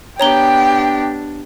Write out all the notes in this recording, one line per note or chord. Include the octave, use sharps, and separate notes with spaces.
B3 D4 G4 C#5 G5 A#5 G7